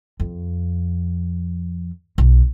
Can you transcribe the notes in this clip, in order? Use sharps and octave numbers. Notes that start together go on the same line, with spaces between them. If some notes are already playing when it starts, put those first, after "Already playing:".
F2
B1